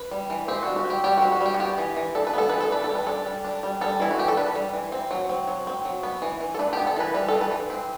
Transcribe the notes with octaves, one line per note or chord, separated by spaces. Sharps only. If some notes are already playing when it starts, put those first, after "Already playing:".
Already playing: B4
G3
E3
C4 G4
G3 F#4
F#4
C4 G4
G3 G4
C4 F#4
F#4
G3
G4
F#4
B3 G4
E3
E3
D4 A4
B4
B3 A4
E3 B4
A4
D4 B4
A4
G3
B4
D4 A4
G3
D4
G3
G3 A4
E3 E4
F#4
E3 G4
A4
D4 B4
G3
E3
C4
F#3
C4
F#3
C4
F#3
B3
E3
E3
A4
D4 B4
B3 G4
A4
E3 B4
G3 B4
E3 A4
B4
E3
C4